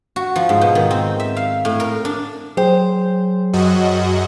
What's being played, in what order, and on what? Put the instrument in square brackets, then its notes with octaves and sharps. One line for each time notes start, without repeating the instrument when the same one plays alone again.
[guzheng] F#4
F3
G#2
B2
D#3
C4
E5
F5
A2
A#4
D4
[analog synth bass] F#3 [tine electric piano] G#4 G5 [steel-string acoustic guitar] C5
[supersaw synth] F#2 F#4 D#5